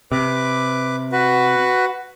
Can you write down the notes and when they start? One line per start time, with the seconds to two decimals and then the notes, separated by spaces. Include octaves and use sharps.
0.12 C3 B4 D6
1.12 F#4 B4